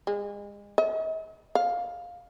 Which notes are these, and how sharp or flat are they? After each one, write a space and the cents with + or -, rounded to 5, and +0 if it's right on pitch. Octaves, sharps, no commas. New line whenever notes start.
G#3 -35
D#5 +45
F5 +10